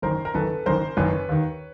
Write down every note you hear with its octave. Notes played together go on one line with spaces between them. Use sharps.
F#1 F#2 D#3 A#4 C5
A#4
F#1 F#2 D#3 A4 B4
F#1 F#2 D#3 A#4 C5
F#1 F#2 D#3 B4 C#5
D#2 D#3